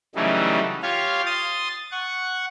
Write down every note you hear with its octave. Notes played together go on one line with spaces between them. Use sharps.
C#3 E3 F#3 G3 A3 D#4
F4 G4 C#5 F5
C6 D#6 A6
F#5 C#6